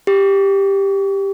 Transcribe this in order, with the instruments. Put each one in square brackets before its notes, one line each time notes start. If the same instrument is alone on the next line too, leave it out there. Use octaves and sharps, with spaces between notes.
[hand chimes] G4